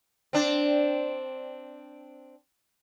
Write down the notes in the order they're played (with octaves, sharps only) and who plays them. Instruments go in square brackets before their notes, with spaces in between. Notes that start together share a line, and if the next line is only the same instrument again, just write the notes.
[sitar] C4 D4